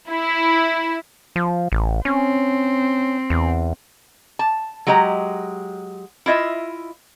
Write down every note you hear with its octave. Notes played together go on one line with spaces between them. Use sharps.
E4
F3
A1
C4 C#4
E2
A5
F#3 G#3 G4 D#5 A#5
E4 F4 D#5 E5